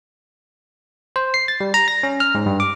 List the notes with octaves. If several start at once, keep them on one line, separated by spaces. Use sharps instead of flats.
C5
C7
A6
G3
A#5
A#6
C#4
F6
G#2
G2
D6